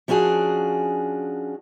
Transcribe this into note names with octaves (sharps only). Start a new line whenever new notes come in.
F3 C#4 D4 F#4 G#4